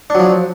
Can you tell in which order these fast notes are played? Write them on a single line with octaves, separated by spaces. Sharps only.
D4 F#3 F3